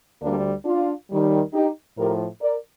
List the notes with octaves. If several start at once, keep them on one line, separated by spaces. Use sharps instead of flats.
D2 D3 G3 A#3 D4
D4 F4
D#2 D#3 G3
D#4 G4
A2 F3 G4 A#4
A#4 D5